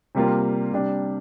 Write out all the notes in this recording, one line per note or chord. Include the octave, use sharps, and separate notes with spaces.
C3 G3 A#3 F4
C3 G3 D4